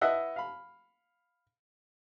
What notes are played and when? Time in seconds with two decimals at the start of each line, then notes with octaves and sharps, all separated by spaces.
0.01 E4 B4 D#5 E5 F#5 E6
0.36 F5 B5